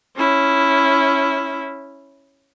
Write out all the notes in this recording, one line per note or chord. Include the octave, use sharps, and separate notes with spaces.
C#4 E4